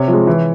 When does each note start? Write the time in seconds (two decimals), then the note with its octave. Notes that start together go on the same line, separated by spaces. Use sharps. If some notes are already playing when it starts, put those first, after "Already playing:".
Already playing: C3 C#5
0.08 F3
0.13 G#3
0.27 E3